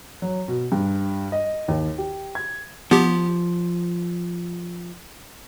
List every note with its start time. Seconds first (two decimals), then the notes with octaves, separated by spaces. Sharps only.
0.22 F#3
0.48 B2
0.72 G2
1.32 D#5
1.68 D#2
1.98 G4
2.35 G#6
2.91 F3 B3 G4